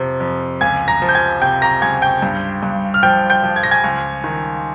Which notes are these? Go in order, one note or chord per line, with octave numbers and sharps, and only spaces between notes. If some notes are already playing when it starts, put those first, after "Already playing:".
Already playing: F2 C3 F3
F2
C#2 G#5 G#6
A#5 A#6
F3
G6
G#5 G#6
C3 G5 G6
A#5 A#6
C#2 G#5 G#6
G5 G6
G2
G2
F6
F3 G5 G6
G5 G6
F3
G#6
A#6
G#5 G#6
C#2
D#3